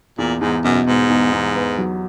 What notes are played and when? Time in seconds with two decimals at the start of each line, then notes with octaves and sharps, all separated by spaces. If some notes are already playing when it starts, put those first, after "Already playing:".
0.18 E2 A#2
0.41 E2 G#2
0.65 F#2 B2
0.87 G#2 B2
1.10 E2
1.33 E2
1.55 B3
1.78 F#3